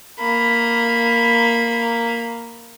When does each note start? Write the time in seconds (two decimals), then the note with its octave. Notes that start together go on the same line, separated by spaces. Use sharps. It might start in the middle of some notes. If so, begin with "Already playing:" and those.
0.20 A#3 B5